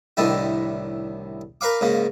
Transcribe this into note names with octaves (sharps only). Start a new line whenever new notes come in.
C2 A2 D3 D#3 G3 E4
A#4 B4 F5 D6
G#2 C#3 A#3